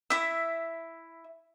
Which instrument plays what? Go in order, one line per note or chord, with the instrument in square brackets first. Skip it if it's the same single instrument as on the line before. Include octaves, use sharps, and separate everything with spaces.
[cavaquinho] E4 E5